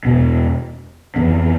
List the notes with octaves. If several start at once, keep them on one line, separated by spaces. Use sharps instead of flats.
E2 B2 B3
F2 E3 B3